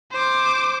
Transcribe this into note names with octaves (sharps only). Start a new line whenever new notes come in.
C5 D6